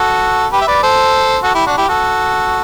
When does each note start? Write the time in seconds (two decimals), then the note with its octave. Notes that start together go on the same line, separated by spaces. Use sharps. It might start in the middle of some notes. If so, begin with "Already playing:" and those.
Already playing: F#4 A4
0.52 G4 B4
0.61 E5
0.67 B4 D5
0.83 A4 C5
1.43 F#4 A4
1.55 E4 G4
1.66 D4 F#4
1.78 E4 G4
1.89 F#4 A4